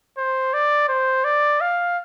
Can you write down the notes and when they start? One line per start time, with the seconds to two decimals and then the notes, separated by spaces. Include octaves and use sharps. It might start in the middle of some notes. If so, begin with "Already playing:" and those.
0.18 C5
0.54 D5
0.89 C5
1.24 D5
1.61 F5